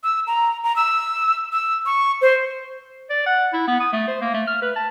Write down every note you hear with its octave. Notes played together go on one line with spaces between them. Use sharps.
E6
A#5
A#5
E6
E6
C#6
C5
D5
F#5
E4
B3
D#6
A3
C5
A#3
A3
F6
B4
A5